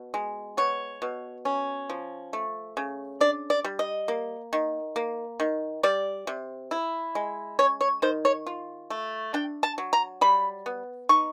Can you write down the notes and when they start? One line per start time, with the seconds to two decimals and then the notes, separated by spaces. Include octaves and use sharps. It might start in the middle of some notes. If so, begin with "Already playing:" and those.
Already playing: B2
0.14 G#3
0.57 B3 C#5
1.02 B2
1.45 C#4
1.90 F3
2.33 A3
2.77 C#3
3.21 D4 D5
3.50 D5
3.64 G3
3.79 D#5
4.08 A#3
4.53 D#3
4.96 A#3
5.40 D#3
5.83 G3 D5
6.27 C3
6.71 E4
7.15 G#3
7.59 C#4 C#5
7.81 C#5
8.02 D#3 C5
8.25 C#5
8.47 F4
8.90 A3
9.34 D4 G5
9.63 A5
9.78 F#3
9.93 A#5
10.21 G3 B5
10.66 B3
11.09 D#4 C#6